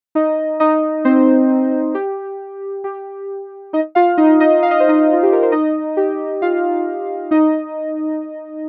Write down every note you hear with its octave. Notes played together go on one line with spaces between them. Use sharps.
D#4 D#5
D#4 D#5
C4 C5
G4
G4
D#4 D#5
F4 F5
D#4 D#5
D#4 D#5
F5
D#5
C5
D#4 D#5
F4
G4
A#4
C5
D#4 D#5
G4
F4 F5
D#4 D#5